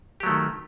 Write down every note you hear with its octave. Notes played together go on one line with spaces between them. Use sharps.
D#3 F#3 A3 G4